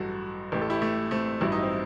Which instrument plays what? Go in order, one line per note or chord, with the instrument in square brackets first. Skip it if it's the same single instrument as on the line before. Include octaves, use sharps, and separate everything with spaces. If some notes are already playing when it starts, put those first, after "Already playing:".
Already playing: [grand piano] A1 G2 F#3 F#4 A4
A1 A2 E3 G4
A4
E4 G4
A3
A3 C4
A1 G2 F#3 E4
D#4
C4